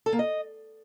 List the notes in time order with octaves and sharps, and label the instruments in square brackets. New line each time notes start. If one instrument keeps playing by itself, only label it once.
[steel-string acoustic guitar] A4
A#3
D#5